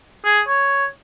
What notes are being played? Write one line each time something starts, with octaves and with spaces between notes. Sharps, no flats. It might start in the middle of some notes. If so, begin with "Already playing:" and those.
G#4
C#5